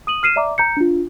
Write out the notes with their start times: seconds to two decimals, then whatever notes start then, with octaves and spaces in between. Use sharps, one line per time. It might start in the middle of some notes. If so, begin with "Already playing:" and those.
0.07 D#6 D#7 F#7
0.23 F6 C7 D#7 E7
0.36 D5 E5 A#5 D6
0.58 A#5 G6 C#7
0.77 D4 F4